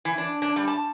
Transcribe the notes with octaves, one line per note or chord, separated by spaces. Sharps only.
E3
D4
D4
G3
A5